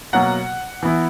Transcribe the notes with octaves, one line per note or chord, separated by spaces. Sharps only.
B2 F#3 A#3 F#5
E3 B3 E4